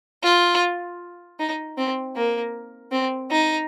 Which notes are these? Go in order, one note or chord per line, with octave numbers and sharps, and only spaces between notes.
F4
D#4
C4
A#3
C4
D#4